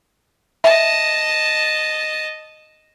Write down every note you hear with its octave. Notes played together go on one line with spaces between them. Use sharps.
D#5 E5 A5